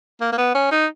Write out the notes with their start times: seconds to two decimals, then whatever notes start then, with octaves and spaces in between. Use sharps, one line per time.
0.21 A#3
0.33 A#3
0.38 B3
0.54 C#4
0.71 D#4